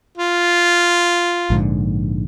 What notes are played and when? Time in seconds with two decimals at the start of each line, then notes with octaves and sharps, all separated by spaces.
0.17 F4
1.50 A#1 G#2 D3